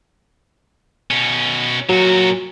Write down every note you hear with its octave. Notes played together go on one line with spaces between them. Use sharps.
B2 C#4
A#2 F#3 F#4